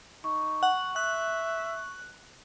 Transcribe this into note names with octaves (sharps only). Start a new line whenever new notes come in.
D#4 C#6
F#5
E5 F#6